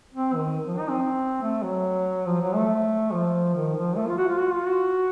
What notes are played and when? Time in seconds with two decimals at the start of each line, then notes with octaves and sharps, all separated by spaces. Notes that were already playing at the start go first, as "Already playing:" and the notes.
0.14 C4
0.35 D#3
0.67 F3
0.78 D#4
0.89 C4
1.42 A3
1.63 F#3
2.26 F3
2.41 F#3
2.55 A3
3.11 F3
3.54 D#3
3.75 F3
3.97 A3
4.07 F4
4.18 F#4
4.28 F4
4.39 F#4
4.52 F4
4.67 F#4